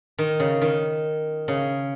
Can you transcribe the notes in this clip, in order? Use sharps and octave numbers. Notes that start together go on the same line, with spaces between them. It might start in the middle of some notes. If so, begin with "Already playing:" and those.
D#3
C#3
D#3
C#3